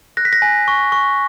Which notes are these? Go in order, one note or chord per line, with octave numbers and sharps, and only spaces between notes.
F#6 A#6
B6
A#6
G#5
C#6
C#6